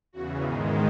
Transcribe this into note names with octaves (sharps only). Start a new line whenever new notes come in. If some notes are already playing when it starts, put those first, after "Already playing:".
E2 C#3 E3 F#4
G#2 D#3 G#3 D#4